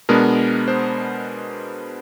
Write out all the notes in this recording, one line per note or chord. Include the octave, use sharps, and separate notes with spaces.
B2 G#3 B3 D4 A#4
C5